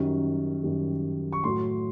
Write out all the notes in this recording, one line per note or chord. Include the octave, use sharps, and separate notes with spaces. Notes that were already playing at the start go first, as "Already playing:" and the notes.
Already playing: F#2 D#3 G3
F#2 D#3 G3
C#6
A2 F#3 C6